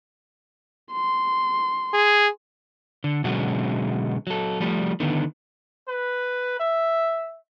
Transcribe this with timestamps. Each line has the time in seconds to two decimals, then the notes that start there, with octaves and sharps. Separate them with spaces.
0.92 C6
1.94 G#4
3.04 D3
3.24 B2 D3 F#3 G#3 C#4 F#4
4.27 F#3 A4
4.60 F3 G3 A3
5.00 D3 D#3 B3
5.88 B4
6.60 E5